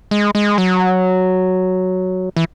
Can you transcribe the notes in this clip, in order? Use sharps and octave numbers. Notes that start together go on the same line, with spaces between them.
G#3
G#3
F#3
E3